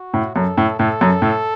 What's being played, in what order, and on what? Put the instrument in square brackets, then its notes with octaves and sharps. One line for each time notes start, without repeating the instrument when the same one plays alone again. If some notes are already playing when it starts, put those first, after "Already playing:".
Already playing: [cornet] F#4
[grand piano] A2
[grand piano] F#2 [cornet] A4
[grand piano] A2
[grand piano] A2 [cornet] A4
[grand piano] F#2
A2